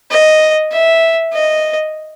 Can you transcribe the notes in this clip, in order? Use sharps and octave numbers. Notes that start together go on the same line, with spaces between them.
D#5
E5
D#5